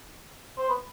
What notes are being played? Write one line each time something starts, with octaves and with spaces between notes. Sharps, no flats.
C5
B4